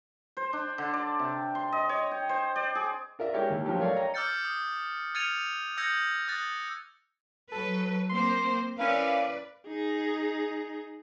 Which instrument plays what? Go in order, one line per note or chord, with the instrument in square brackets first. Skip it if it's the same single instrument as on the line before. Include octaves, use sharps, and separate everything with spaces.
[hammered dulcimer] C5
D4
D3
D5
C3
C6
D#5
C#5
G5
C5
D5
G#4
[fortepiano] F4 A#4 D5 E5
G#3 E4 G4 A#4 C#5
D#2
F3 F#3 A3 G4 A4
A3 A#4 C#5 D5 F5
C#5 D#5 G5 A#5
[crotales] D6 E6 F6 G6 A6 C#7
D#6
F6 G#6 A6 C#7 D#7 F7
D#6 E6 G6 G#6 A#6 C#7
D#6 F#6 A6
[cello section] F#3 B4 [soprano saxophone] A4
[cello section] A#3 C4 C5 [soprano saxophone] C6
[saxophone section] C#4 E4 F5 [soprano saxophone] A#4 [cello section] B4 D5
[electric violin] D#4 G#4